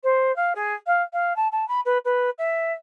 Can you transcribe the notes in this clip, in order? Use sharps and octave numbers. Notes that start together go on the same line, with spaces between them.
C5
F5
G#4
F5
F5
A5
A5
B5
B4
B4
E5